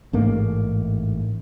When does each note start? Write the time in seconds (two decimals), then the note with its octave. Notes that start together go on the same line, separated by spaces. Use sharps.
0.13 A1 G#2 A3 A#3